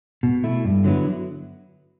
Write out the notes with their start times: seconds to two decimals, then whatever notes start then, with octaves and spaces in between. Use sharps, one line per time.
0.23 B2
0.44 A3 E4
0.65 G2
0.84 D3 F#3 B3 E4